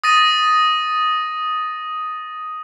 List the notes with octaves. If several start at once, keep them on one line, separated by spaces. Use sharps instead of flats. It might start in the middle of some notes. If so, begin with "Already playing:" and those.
D#6 A6 A#6 D#7